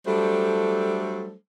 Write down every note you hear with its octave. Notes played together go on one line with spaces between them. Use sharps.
F#3 G3 A3 D4 A4 C5